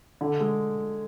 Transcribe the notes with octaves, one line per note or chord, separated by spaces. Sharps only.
D3
G#3